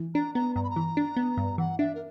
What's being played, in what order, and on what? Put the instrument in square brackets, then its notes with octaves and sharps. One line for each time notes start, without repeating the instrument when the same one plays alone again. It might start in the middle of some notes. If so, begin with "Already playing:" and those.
Already playing: [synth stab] E3
[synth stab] D4 [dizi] A#5
[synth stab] B3 [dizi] A#5
[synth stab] G2 [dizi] A#5
[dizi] B5
A#5
[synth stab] E3
D4
B3
G2
[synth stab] E3 [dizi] F#5
[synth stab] D4 [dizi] E5
[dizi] A#4